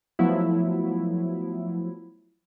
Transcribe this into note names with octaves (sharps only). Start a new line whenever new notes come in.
F3 F#3 A3 B3 E4